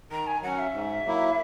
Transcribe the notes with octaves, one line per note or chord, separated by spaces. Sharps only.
D#3 A#5
G#5
F#3 C#4 F#5
E5
G#2
F#3 A#3 E4